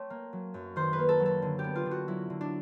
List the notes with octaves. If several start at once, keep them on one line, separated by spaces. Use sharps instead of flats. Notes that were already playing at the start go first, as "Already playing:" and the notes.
Already playing: A3 C4 C#5
A#3
F#3
F#2
D#3 C5
B4
A#3
A4
F#3
A4
D3
G4
B3
F4
D3
F#4
F#3 E4
D3
D4